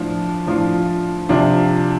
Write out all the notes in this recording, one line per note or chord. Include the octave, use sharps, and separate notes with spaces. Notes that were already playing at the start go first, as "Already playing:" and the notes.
Already playing: A2 F3 D4 F4
A2 F3 D4 F4
C3 F3 D4 F4